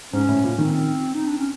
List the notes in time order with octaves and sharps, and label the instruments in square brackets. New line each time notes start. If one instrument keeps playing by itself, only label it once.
[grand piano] G#2 [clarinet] C#4
[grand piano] A2
A#2
[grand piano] D#3 [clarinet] C4
[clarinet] D#4
D4
C#4